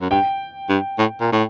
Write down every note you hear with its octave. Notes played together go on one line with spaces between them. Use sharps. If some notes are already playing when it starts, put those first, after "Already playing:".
F#2
G2 G5
G2
A2
A#2
A2